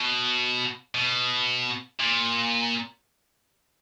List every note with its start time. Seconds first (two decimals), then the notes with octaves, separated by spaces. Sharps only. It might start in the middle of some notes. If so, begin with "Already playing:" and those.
Already playing: B2
0.95 B2
2.00 A#2